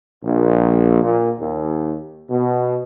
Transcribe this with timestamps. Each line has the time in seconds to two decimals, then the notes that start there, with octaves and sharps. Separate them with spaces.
0.24 A#1
1.02 A#2
1.39 D#2
2.30 B2